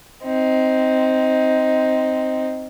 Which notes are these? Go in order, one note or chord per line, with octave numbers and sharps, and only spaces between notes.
C4 D#4